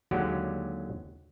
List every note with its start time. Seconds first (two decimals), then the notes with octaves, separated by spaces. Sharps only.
0.11 D#2 D3 F#3 G#3 G4 F#5